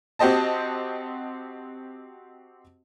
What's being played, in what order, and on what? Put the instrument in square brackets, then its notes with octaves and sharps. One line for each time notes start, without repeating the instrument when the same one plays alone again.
[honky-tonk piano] C4 F#4 G4 C5 D#5 A5